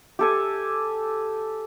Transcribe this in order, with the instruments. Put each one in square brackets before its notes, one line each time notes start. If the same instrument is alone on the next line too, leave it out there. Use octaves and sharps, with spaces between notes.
[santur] G4 A4 G#5